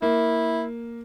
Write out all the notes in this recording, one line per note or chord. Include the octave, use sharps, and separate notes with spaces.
A#3 E4